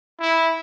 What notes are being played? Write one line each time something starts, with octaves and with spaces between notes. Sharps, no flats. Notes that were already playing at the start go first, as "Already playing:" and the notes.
E4